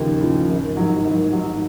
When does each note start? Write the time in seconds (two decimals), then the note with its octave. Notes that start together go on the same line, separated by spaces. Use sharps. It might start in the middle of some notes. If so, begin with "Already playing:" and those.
Already playing: D#2 C#3 F3
0.20 C#3 F3
0.49 G#1
0.77 G#2 F#3
1.04 G#1
1.33 G#2 F#3